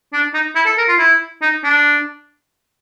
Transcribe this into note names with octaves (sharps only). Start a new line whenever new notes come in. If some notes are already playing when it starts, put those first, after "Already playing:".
D4
D#4
E4
A4
A#4
F4
E4
D#4
D4